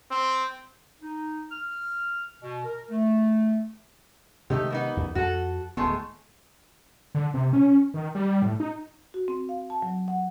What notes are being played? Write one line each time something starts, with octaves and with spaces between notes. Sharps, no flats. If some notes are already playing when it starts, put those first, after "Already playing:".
C4
D#4
F6
B2
A#4
A3
C3 D#3 G#3 A3 D#4 G4
A#3 B3 D#4
E2
F2 F#4 A4
D1 D#3 G#3 A3 B3
D3
C3
C#4
D#3
G3
A2
D#4
F#4
C4
F5
A5
F#3
F#5